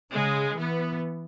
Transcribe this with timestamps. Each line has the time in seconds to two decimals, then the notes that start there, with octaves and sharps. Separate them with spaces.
0.13 C#3 G#3
0.57 E3 B3